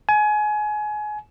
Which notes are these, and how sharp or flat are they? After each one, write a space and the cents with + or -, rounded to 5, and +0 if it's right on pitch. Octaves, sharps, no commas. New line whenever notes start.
G#5 +25